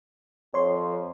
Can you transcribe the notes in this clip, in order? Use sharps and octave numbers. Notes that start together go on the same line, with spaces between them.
F2 C#5 C6